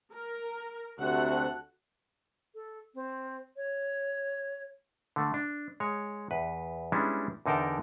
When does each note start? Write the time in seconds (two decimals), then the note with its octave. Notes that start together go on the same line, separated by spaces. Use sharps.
0.13 A#4
0.99 D2 C3 F#4 A4 F#5
2.55 A4
2.94 C4
3.56 C#5
5.16 D3 A3
5.34 D4
5.80 G#3 C#5
6.31 E2 B4
6.92 G3 G#3 B3 C#4 D4 E4
7.46 E2 D3 D#4 A#4 G5 A5